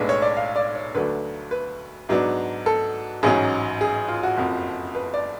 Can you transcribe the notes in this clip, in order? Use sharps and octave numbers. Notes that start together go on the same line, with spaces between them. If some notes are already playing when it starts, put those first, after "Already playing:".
Already playing: B1 A2 G#3 D4 B4
C#5
D5
F5
D5
C#5
D2 D3 F#3 A3 D4 B4
B4
G#2 F#3 B3 D4
A4
A1 G#2 F#3 C#4 G#4
G#4
F4
F#4
F#1 F2 F3
B4
D5